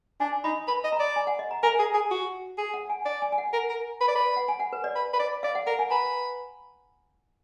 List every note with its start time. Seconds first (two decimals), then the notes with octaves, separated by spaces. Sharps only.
0.20 D4 G#5
0.44 D#4 B5
0.68 B4 B5
0.84 D#5
0.92 A#5
1.00 D5
1.16 G#5
1.27 F#5
1.39 D#5
1.51 A#5
1.63 A#4 G#5
1.79 G#4
1.94 G#4
2.11 F#4
2.58 G#4
2.74 F#5
2.90 G#5
3.06 D5
3.22 G#5
3.32 G#5
3.38 F#5
3.53 A#4
3.69 A#4
4.01 B4
4.08 D5
4.15 B4
4.37 F#5
4.48 G#5
4.60 F#5
4.73 B4
4.84 D5
4.95 B4
5.13 B4
5.19 D5
5.43 D5 F5
5.55 F#5
5.67 A#4 F#5
5.79 G#5
5.91 B4 A#5